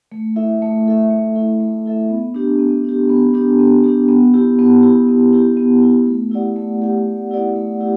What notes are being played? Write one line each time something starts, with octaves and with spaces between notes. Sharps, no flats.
A3
E4 A4 E5
A3
E4 A4 E5
A3
E4 A4 E5
A3
E4 A4 E5
B3
D4 G4
B3
D4 G4
B3
D4 G4
B3
D4 G4
B3
E4 G4
B3
E4 G4
B3
E4 G4
B3
E4 G4
A3
E4 G4 D5 F#5
A3
E4 G4 D5 F#5
A3
E4 G4 D5 F#5
A3
E4 G4